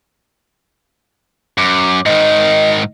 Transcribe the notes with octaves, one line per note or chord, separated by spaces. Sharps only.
F#2 D6
G#2 D#3 D#5